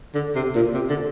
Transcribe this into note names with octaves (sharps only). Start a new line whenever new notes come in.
D3
C3
A#2
C3
D3